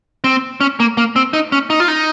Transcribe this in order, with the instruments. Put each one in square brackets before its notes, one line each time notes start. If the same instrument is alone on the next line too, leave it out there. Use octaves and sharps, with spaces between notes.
[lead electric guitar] C4
C#4
A#3
A#3
C4
D#4
C#4
D#4
F4
D#4